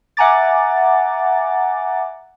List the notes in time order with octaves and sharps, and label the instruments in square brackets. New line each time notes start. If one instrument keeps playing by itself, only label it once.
[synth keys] E5 F#5 G#5 A#5 D6 A6